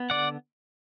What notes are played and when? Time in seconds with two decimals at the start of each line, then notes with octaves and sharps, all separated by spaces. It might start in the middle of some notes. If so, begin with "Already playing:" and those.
Already playing: B3
0.10 D3 D5 F#5